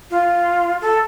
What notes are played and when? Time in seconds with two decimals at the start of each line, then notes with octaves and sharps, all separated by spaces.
0.10 F4
0.81 A4